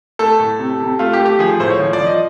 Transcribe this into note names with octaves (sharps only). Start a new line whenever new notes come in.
A3 A4
A2
C3
C3
A3 F4
G4
A3
G4
F3 G#4
A2 C5
C#5
F3
D5
F3
D#5